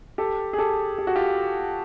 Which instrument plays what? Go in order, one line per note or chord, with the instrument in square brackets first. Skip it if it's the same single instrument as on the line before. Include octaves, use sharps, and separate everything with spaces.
[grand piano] G4 A4
G#4
G4 A4
G4
F#4
F4 G4